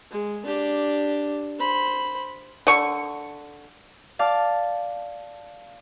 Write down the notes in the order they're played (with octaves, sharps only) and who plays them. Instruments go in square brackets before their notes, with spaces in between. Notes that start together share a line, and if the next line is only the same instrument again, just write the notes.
[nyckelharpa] G#3
D4 G4
C5 B5
[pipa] D3 C#6
[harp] D5 F5 A5